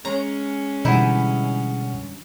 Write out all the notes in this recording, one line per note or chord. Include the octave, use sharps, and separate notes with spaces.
G#3 C#4 A#5
B2 D3 E3 G3 D#4 E4 F#5